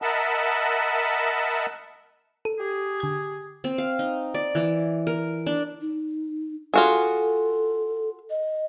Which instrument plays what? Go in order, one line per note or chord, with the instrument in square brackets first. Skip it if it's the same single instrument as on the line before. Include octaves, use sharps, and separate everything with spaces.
[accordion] A#4 D#5 E5 F#5 A5 B5
[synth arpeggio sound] A4
[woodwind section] G4 G#4
[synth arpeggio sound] D3 G#6
[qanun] C4
F5
D#4
D5
E3
A#4
D4
[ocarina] D#4
[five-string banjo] F4 F#4 G#4 [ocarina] A4
[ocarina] D#5